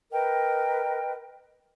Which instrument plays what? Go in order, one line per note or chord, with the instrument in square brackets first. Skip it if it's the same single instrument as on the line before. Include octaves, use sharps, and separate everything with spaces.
[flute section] A#4 B4 D#5 G5